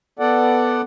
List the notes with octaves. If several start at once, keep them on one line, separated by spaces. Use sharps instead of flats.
B3 A4 D5 F#5